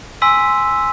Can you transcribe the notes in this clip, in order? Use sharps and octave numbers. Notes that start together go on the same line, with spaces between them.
G#5 C6 E6 B6 D#7